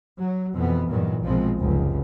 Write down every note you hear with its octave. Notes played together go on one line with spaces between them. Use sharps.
F#3
F2 B2 E3 B3
E2 G2 A#2 D#3 E3 F#3
A#1 G#2 B2 F3 G#3 C4
F1 C#2 F#2